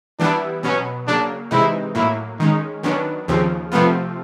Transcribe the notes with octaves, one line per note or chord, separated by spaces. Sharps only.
E3 G3 B3 D4 E4
B2 F#3 B3 C#4
C#3 F#3 A#3 D4
C3 E3 G#3 C4 D#4 E4
A2 F#3 A#3 E4
D#3 G#3 C#4 D#4
D#3 F#3 B3 C#4 D4
D#2 C#3 F3 C4
C3 F3 A3 B3 C4 F4